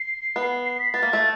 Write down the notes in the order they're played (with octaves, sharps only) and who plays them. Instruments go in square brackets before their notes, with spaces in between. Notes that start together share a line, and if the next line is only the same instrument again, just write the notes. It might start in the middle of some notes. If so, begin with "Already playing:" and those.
Already playing: [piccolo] C7
[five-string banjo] B3
[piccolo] C7
B6
[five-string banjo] B3 [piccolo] A6
[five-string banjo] A#3
A3